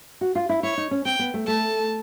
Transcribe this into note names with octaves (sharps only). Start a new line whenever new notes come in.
F#4
F4
E4
E4 C#5
D#4
C#4
C4 G5
B3
A3
A3 A5